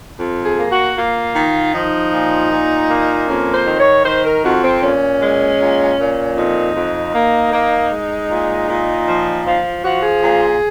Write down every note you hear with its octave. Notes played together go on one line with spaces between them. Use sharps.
F2
G#4
A#3
F#4
A#3 F4
D#3
F3 D#4
A#2
A#2
A#3
F2 C#4
C5
D#3
C#5
D#3 C5
A#4
F2 F#4
C4
A#2 C#4
G#3
A#2
A#2
F2 D#4
F2
A#3
A#3
G#3
A#2
A#2
F3
F3 F4
F3 F#4
G#4
A#2